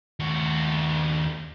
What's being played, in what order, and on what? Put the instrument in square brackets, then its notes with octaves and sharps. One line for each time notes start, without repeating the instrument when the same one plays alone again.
[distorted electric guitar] D#2 F#4